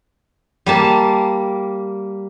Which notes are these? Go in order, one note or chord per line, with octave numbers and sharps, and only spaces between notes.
G3 A#3 A5